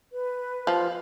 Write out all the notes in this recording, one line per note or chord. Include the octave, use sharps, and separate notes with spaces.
B4
F3